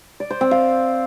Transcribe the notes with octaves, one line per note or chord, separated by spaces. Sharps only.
D5
C5
C4
F5